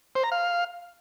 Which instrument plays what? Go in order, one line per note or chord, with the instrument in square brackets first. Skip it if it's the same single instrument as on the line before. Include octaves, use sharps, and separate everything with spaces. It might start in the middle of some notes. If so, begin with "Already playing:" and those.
[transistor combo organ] C5
A#5
F5